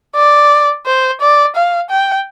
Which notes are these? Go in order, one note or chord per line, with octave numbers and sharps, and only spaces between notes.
D5
C5
D5
F5
G5